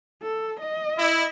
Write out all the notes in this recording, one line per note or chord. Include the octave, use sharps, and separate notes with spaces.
A4
D#5
E4